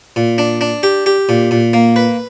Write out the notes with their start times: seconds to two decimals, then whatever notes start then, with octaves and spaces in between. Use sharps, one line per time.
0.16 A#2
0.38 D4
0.61 D4
0.83 G4
1.06 G4
1.29 A#2
1.51 A#2
1.73 A#3
1.96 B4